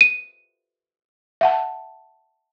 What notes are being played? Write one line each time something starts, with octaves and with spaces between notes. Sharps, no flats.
D#7
E5 F#5 A5